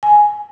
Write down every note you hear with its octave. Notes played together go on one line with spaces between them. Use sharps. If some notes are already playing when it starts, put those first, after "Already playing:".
G#5